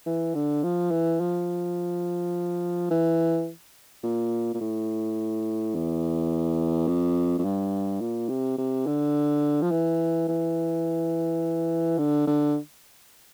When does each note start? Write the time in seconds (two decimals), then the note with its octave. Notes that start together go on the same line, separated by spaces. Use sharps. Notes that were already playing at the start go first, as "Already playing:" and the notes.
0.06 E3
0.35 D3
0.63 F3
0.91 E3
1.20 F3
2.91 E3
4.03 A#2
4.54 A#2
4.61 A2
5.75 E2
6.88 F2
7.38 F2
7.45 G2
8.01 A#2
8.29 C3
8.58 C3
8.86 D3
9.62 F3
9.71 E3
10.28 E3
11.98 D3
12.27 D3